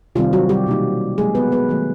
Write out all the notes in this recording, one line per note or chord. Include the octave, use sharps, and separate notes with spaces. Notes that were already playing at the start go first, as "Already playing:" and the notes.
C3 D#3 G3 C4 F4
F#3 F#4
G3 G4
B2 F#3 A#3 D#4
D#3 F#3 G#3 A#3 G#4
B3 B4
B3 B4
D#3 F#3 A3